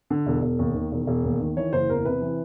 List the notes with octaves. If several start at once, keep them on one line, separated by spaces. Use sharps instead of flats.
D3
E1
E1
D#2
D#3
E1
E1
D#2
D#3
E3 C#5
F#1 C5
E2 A#4
C3 B4
E3